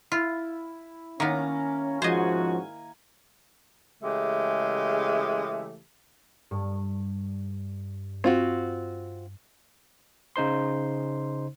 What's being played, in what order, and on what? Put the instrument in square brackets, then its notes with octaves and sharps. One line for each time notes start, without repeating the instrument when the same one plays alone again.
[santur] E4 [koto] F4
[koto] D#3 B3 [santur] A#3 A#5 D6 [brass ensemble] C#4
[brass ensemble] G#2 C#4 F#4 [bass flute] F3 [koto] C5 D#5 [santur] G#5
[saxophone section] C#3 E3 G#3 A3 G4
[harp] G2
[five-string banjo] C4 F4 F#4
[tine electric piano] C#3 D#4 C5 C6